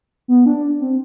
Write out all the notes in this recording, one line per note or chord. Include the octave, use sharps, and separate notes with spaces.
B3
D4
C4